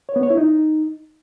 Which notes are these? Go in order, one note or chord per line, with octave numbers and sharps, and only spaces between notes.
C#5
B3
C#5
E4
D#4